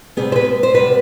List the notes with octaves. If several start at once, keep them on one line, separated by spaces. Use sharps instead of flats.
C3 G3 B3 G#4
C5
B4
C5
C3 G3 B3 B4